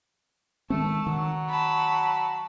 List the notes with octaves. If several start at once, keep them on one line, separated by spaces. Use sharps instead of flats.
D#3 G#3 A3 C4 A5
D#3 F#3
A5 B5